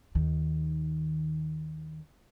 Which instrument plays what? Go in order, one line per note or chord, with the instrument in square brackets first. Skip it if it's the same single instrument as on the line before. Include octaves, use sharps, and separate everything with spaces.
[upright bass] D#2 D#3